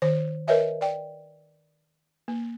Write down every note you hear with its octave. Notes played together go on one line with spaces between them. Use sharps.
D#3 C5
A#4 B4 C#5 D#5 E5 G#5
D5 G5
A#3